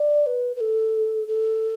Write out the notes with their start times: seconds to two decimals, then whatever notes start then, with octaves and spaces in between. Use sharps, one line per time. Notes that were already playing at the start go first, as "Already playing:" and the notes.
Already playing: D5
0.26 B4
0.56 B4
0.61 A4
1.28 A4